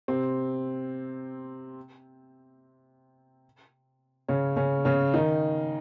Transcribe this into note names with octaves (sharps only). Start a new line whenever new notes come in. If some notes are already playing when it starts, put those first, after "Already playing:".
C3 C4
C#3 C#4
C#3 C#4
C#3 C#4
D#3 D#4